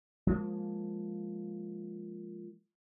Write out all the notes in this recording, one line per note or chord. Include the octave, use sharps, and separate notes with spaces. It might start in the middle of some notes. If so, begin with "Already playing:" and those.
F3 G#3 A#3